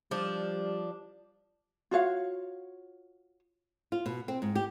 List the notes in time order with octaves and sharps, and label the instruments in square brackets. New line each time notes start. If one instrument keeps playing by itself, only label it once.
[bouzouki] F3 D4 [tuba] G3
[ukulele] F4 F#4 C#5 F5
[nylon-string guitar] F4
B2
C4
G#2
G4